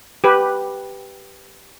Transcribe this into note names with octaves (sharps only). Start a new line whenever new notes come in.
G4 B4